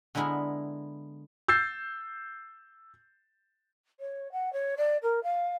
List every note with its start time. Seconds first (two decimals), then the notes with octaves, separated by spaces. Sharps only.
0.15 D3 G#3 B3 E4 G#4 A#4
1.48 E6 G6 A6 C7
4.00 C#5
4.32 F#5
4.53 C#5
4.77 D5
5.02 A#4
5.23 F5